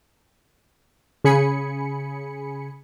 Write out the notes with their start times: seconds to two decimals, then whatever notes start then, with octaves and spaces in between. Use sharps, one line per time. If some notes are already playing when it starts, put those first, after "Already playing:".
1.24 C#3 G#4 G#5 B5 C#7